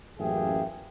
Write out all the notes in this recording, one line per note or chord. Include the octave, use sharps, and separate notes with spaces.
A1 F#2 A#3 G#4 E5 G5